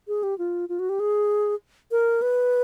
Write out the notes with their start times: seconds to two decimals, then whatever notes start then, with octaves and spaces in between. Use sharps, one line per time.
0.08 G#4
0.23 G4
0.38 F4
0.69 F4
0.79 F#4
0.89 G4
1.00 G#4
1.91 A#4
2.22 B4